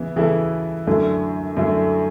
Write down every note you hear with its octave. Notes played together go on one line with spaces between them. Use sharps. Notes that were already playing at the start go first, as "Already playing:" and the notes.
Already playing: C#3 E3 B3 E4
C#3 E3 B3 E4 A4
F#2 D3 A3 E4
F#2 D3 A3 E4